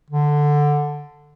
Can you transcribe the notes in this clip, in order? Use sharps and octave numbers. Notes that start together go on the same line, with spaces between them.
D3